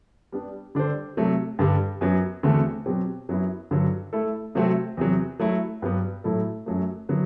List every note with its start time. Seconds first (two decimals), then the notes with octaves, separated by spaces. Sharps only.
0.32 G3 B3 D4
0.75 D3 G3 D4 A4 C5
1.17 C3 F#3 A3
1.59 G2 D3 G3
2.01 F#2 F#3 B3
2.43 E2 D3 A3 C4 F#4
2.86 B2 F#3 C4 G4
3.29 F#2 F#3 B3 E4
3.71 G2 D3 F#3
4.13 A3 E4 A4
4.55 C3 F#3 A3 C4 F#4
4.97 E2 C3 F#3
5.40 F#3 A3 E4
5.82 G2 F#3 B3
6.24 A2 F#3 A3 E4 A4
6.66 F#2 F#3 A3
7.09 D3 F#3 B3 E4